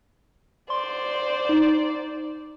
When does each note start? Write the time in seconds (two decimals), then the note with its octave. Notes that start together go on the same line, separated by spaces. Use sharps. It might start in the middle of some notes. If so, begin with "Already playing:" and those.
0.70 C5 D5 C6
1.49 D#4